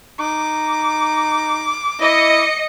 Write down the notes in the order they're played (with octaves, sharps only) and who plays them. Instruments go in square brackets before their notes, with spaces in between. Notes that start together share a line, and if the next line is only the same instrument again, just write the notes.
[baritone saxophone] D#4 [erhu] D6
[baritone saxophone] E4 [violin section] D#5 C#7